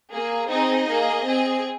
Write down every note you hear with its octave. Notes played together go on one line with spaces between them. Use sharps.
A#3 G#4
C4 D#4 G#4 D#5
A#3 G#4
C4 G#4